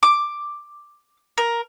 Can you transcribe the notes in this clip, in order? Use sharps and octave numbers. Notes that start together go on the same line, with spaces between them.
D6
A#4